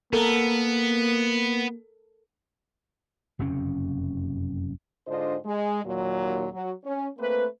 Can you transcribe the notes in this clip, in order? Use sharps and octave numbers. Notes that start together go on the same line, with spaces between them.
A#3 B3 A4 A#4
F#1 F2 C3 C#4
G#2 D3 D4 F4 C5 D#5
G#3
D#2 A#2 F#3
F#3
C#4
A3 A#3 C4 B4